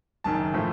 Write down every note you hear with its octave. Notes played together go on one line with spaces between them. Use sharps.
F#1 F#2 D#3 A5
A2 F3 A3